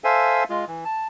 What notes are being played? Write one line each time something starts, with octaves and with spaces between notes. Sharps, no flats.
A4 C5 E5 F5 G#5
G#3 F4
E3
A5